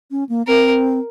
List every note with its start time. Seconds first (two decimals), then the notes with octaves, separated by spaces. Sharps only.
0.11 C#4
0.29 A#3
0.47 C4 A#4